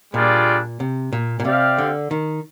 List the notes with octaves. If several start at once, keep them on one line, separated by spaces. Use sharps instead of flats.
A#2 G3 D4 F4 G#4 D5
C3
A#2
A#2
C3 C4 G4 D5 F5
D3
D#3